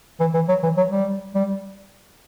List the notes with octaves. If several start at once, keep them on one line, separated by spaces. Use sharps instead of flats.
E3
E3
F#3
E3
F#3
G3
G3